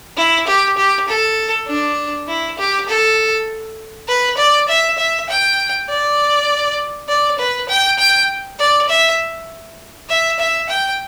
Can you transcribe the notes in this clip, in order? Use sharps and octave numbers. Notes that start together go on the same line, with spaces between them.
E4
G4
G4
A4
D4
E4
G4
A4
B4
D5
E5
E5
G5
D5
D5
B4
G5
G5
D5
E5
E5
E5
G5